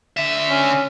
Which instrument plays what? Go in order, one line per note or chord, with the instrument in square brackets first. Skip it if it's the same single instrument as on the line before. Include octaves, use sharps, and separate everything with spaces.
[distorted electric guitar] D3 E5
[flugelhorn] C#4